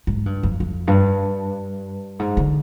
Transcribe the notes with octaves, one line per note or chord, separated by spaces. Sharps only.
G#2
G2
F2
F2
G2
G#2
D3